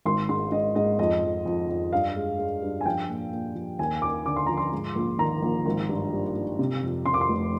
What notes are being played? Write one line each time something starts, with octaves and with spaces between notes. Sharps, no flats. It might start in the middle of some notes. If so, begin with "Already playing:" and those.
G#1 C6
G#2 C6
G#2 D#5
G#2 D#5
F2 D#5
F2
F2
F2
G2 F5
G#3
G#3
G2
G#5
F3 G5
A#2
A#2
F3
D#2 G#5
D#2 D6
D3 D6
C6
F3 A#5
C6
G#2
A#1
D#3 A#5
A#1
G#1
G2
G3
G3
C3
F2
C3 C6
D6
C6
F1